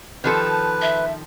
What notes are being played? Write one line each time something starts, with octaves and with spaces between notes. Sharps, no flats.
D#3 F3 A4 B4
E5